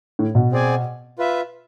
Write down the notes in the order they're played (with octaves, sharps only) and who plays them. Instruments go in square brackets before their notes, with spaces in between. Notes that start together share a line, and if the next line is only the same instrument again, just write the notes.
[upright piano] A2
B2
[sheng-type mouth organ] C4 G#4 D5 G#5
F4 B4 E5